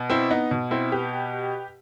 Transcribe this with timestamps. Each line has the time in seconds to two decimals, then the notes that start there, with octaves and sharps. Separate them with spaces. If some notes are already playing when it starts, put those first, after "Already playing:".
Already playing: B2
0.10 C4 E4
0.31 B3 D#4
0.51 B2
0.71 C4 E4
0.92 G4 B4